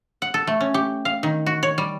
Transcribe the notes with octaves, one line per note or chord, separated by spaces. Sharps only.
F#5
A4
A3
C#4
G4
F5
D#3
F#4
C#5
G3